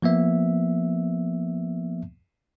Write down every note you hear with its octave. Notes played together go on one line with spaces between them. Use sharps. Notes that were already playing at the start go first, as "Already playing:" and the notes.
F3 A#3 B3 E5